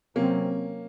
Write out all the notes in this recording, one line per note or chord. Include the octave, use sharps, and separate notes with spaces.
C3 F#3 A#3 C4 C#4